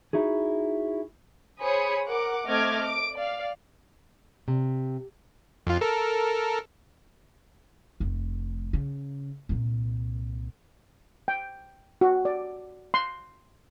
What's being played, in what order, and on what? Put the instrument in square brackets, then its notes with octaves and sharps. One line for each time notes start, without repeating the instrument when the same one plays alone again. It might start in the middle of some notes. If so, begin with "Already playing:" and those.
[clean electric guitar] D#4 E4 F#4 G#4
[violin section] G#4 C5 C#5 B5 D#6 C#7
A#4 F#5 D6
A3 C4 D#5 D6 F6 G#6
D6 D7
D5 F5
[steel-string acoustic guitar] C3
[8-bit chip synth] F2 F4
A4 A#4
[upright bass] F1 A3
C#3
C2 A#2
[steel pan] G5
F#4
D5
C6